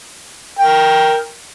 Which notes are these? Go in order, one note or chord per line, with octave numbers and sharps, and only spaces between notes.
A#4 G5